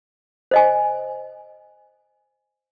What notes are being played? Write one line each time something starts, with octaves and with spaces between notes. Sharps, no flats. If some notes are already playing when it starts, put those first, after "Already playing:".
C5 D#5 G#5